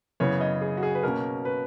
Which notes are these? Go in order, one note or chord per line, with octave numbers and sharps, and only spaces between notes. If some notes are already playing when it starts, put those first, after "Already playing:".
F#2 C#3 E3 B3 C#5
D#5
G#4
F#4
G#4
B4
B2 A#3 C#4 A#4
B4